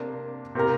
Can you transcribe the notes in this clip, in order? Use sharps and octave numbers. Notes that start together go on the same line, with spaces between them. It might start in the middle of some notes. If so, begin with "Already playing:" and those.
Already playing: C3 A#3 D4
C3 A#3 G4 A#4